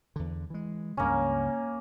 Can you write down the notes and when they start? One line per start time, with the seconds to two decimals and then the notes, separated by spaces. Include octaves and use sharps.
0.16 E2 D3
0.50 E3 G#3
0.97 C#2 G2 C#3 A#3 C#4